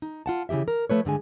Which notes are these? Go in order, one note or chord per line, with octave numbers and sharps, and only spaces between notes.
D#4
F4 F#5 A5
C#3 E3 G#3 G4 E5
A#4
F3 A3 B4 C#5
G2 D3 G#3 G#5